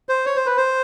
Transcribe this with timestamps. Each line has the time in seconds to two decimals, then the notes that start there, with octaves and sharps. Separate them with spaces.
0.09 C5
0.26 C#5
0.36 C5
0.46 B4
0.57 C5